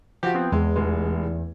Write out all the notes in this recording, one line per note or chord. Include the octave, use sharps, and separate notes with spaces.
F3 F#4 G4
B3 C4
E2 G#3
F1 G#3